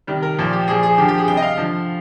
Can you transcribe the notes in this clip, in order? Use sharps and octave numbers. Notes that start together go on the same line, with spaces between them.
C3 D#3 G3
A#4
A#2 F3
G4
A#2 F3 G#4
G#4
D3 F3 G4
G4
G#4
C3 G3 G5
D#5
F5
D3 F3